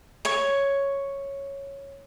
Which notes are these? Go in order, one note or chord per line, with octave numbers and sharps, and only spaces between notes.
C#5 C#6